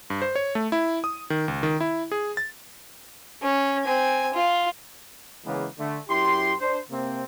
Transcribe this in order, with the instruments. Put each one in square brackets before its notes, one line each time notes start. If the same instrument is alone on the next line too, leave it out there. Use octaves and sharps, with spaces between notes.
[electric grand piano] G2
C5
C#5
A3
E4
D#6
D#3
C#2
D#3
E4
G#4
A6
[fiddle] C#4
C4 G#5
F4
[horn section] C#3 E3 G#3 A#3 B3
D3 A3
F#2 E4 G4 C6
D4 C5
C3 A#3 C4